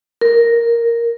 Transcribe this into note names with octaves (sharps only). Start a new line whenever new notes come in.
A#4